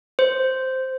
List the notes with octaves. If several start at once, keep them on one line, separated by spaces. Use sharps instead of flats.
C5